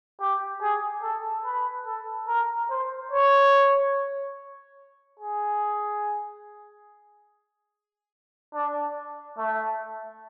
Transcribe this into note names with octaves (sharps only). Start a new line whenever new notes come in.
G4
G#4
A4
B4
A4
A#4
C5
C#5
G#4
D4
A3